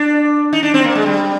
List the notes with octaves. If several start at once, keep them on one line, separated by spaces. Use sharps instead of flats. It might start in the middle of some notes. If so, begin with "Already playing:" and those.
Already playing: D4
D#4
D4
C4
A#3
G#3
G3